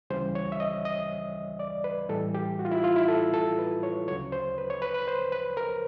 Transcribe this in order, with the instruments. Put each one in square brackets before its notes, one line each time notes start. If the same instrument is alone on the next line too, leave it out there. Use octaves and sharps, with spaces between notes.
[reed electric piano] D2 C#3 E3 G3 C5
C#5
E5
D#5
D#5
D5
B4
A2 E3 G3 A4
G4
F#4
F4
E4
F4
E4
A4
A4
B4
C#5
D2 C#3 F#3 C#5
C5
B4
C#5
B4
B4
C5
B4
A#4